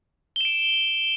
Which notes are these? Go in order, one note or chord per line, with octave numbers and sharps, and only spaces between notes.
D7 E7 G7